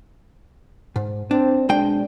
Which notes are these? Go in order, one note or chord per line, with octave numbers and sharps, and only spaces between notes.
G#2
C4 D4
B1 G#3 D4 G5